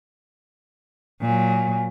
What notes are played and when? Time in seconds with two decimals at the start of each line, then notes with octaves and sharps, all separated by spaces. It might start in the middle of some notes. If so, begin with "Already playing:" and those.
1.21 A#2 F#3 G#5